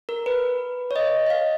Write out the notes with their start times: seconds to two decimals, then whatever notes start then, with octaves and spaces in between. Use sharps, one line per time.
0.09 A#4
0.26 B4
0.91 C#5
0.96 D#5
1.26 D#5
1.30 F5